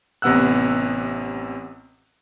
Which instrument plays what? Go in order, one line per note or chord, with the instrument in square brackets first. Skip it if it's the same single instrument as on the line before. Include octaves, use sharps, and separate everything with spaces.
[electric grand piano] A1 C3 B3 F#5 E6 F#6